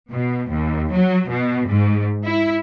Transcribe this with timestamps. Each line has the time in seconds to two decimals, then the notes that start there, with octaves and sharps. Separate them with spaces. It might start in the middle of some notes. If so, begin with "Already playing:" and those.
0.11 B2
0.49 D#2
0.92 F#3
1.29 B2
1.68 G#2
2.25 E4